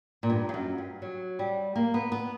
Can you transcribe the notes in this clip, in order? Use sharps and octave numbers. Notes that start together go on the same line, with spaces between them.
A#2
G2
G2
F#2
G2
F#3
G3
A#3
B3
B3